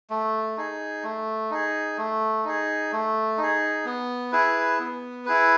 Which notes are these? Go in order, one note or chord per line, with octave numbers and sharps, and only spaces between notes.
A3
D#4 G#4
A3
D#4 G#4
A3
D#4 G#4
A3
D#4 G#4
B3
E4 G#4 B4
B3
E4 G#4 B4